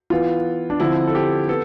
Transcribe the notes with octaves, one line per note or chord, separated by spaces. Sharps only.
E3 B3 F4
D4
D3 F3 C4 E4
A4
G4
B3 A4